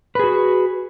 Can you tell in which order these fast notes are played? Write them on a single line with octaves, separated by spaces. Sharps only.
B4 G#4 F#4